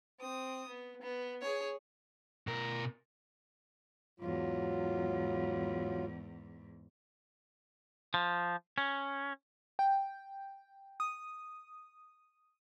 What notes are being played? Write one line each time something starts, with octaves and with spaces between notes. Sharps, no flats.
C4 D#6
B3
B3
G#4 C#5
B2 A#4
E2 G#2 F#3 F4
F3
C#4
G5
D#6